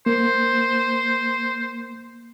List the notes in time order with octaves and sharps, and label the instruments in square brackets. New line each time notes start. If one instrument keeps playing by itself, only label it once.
[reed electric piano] A#3 [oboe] C5